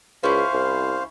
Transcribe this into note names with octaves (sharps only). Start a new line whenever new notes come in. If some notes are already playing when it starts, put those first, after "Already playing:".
C#2 C#4 E4 C5 F5
C2